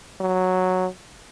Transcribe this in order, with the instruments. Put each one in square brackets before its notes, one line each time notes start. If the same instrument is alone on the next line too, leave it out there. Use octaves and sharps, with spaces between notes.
[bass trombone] F#3